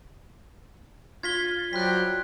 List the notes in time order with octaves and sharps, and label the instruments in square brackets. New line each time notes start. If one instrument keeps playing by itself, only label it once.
[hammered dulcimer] F4 [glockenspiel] G#6 B6 G7
[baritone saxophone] F#3 [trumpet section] G3 C5 G5 [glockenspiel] F#6 B6